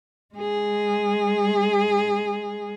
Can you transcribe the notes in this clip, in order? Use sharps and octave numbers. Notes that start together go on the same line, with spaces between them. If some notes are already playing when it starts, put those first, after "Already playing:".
G#3 G#4